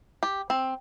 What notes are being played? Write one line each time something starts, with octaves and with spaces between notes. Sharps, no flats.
G4
C4